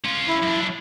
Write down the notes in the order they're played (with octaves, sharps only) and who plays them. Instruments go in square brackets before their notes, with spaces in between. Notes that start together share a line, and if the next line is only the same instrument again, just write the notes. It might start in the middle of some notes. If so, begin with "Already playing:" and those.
[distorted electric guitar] C#4 F4
[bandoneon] E4
[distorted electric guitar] F#2 D4